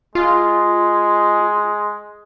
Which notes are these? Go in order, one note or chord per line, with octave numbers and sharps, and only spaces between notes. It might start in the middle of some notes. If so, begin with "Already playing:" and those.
G#3 F4